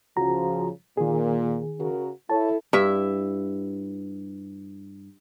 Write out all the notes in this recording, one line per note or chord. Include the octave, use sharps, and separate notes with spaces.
C#2 C#3 F3 F#4 A#5
A#2 D#3 G#4
C#3 F#4 A#4
E4 A4 C#5 A5
G2 E4 E5